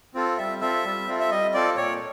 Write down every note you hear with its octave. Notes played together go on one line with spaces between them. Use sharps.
C4 F4 A4
G3 E5
C4 F4 A4 E5
G3
C4 F4 A4
E5
G3 D#5
C4 F4 A4 D5
A#2 C#5